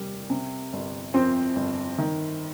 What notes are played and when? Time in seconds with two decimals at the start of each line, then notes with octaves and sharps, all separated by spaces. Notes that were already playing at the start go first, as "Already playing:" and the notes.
Already playing: F1 D#2 G3
0.30 C3
0.73 G1
1.14 F2 C4 C5
1.56 G1
1.98 D#3